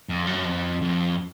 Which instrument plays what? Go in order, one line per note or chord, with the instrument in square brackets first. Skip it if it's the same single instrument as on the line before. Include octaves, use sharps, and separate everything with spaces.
[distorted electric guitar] F2
F#2
F2
F2